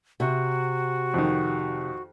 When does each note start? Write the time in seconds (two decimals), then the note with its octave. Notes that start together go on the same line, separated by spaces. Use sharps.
0.20 C3 F#4
1.14 F2 D#3